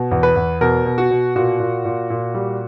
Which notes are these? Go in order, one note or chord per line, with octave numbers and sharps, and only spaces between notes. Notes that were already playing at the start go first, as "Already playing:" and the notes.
Already playing: B2
E2
B4
E2
B2 A#4
B2
F#4
B2
A#2 F#4
A#2
A#2
A#2
G3